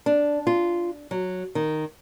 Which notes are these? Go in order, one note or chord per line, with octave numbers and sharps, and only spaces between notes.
D4
F4
F#3
D#3